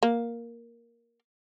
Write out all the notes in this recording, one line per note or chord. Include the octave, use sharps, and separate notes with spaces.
A#3